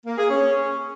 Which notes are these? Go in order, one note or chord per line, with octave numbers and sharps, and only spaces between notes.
A#3
G#4
C#4